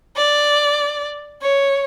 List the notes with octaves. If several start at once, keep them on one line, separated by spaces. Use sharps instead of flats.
D5
C#5